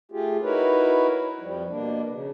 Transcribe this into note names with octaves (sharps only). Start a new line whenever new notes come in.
A3 F4 G4 G#4
D#4 E4 F#4 A#4 B4 C#5
F2 F3 G3
B2 A#3 D4
C#3